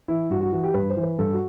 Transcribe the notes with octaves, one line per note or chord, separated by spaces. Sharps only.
E3 E4
G2 F#4
F#4
E3 F#4
G4
G2 B4
C5
E3
B4
G2 A4
F#4